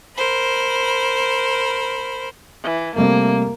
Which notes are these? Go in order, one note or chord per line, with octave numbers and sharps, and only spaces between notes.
A#4 C5 B5
E3
C3 G3 A3 A#3